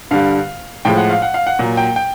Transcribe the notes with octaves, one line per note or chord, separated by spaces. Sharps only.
G2 D3 G3 F5
A2 F3 G#3 G5
F#5
F5
F#5
F5
F#5
A#2 F#3
G5
G5